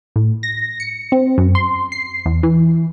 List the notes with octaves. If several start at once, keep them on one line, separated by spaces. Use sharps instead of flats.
A2
A#6
C#7
C4
F#2
C6
C7
E2
E3